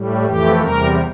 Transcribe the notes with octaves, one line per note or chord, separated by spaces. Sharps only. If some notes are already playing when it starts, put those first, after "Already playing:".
Already playing: A2 G3
F2 E3 A3 G4
E2 C3 G3 A#4